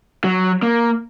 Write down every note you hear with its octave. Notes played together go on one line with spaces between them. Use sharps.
F#3
A#3